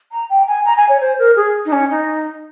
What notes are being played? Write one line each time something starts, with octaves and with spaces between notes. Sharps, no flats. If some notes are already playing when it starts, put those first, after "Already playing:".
A#5
G5
G#5
A#5
G#5
C#5
C5
A#4
G#4
D#4
C#4
D#4